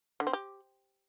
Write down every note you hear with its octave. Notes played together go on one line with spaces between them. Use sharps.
D3
C4
G4